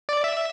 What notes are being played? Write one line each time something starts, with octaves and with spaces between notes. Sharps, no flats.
D5
E5